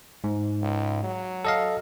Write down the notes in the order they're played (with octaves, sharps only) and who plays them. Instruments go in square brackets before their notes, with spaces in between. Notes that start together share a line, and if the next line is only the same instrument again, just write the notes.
[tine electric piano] G#2
[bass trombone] C#2
F#3
[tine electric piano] A4 D#5 F5